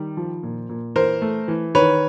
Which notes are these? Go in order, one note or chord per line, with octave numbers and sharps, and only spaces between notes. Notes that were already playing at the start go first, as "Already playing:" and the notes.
Already playing: D#3 G3
F3
A#2
A#2
E3 A#4 C5
A3
E3
D#3 B4 C#5